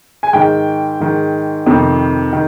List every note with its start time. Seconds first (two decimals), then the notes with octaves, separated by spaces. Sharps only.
0.23 G#5
0.33 G#2 D#3 G5
1.00 G#2 D#3
1.66 F2 C3 D#3
2.33 D#3